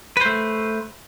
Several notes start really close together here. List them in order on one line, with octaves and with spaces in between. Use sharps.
B4 C5 A3